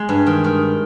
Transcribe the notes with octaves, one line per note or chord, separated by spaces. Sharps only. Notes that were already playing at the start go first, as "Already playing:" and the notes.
Already playing: G#3
G2
D#3
D#3